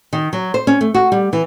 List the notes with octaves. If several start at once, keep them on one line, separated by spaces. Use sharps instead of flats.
D#3
F#3
C5
C#4
A3
F#4
G3
E3